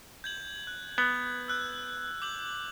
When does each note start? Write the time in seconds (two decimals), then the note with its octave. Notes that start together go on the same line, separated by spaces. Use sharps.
0.24 G6 G#6 F#7
0.67 F#6
0.98 B3 G#6
1.48 E6 F#6 G6
2.22 D6 G6 F#7